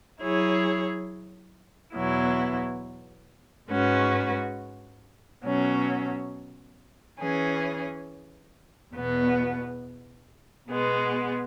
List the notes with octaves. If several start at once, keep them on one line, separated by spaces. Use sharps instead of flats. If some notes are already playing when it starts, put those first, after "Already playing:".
F#3 E4 G#4 C#5
E2 B2 F#3 E4
G#2 G#3 C#4 F#4 B4
B2 F#3 C#4
E3 C#4 G#4
E2 B2 B3
B2 G#3 B3